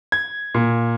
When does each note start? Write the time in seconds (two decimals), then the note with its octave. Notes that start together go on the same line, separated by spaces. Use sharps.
0.12 G#6
0.54 A#2